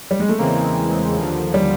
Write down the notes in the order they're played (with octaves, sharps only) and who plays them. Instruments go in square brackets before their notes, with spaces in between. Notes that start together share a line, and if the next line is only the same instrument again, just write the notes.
[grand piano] G3
G#3
A3
[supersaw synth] E2 C#3 E3 G#3 C4 [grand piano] A#3
[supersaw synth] D#2 D3 F3
[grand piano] G3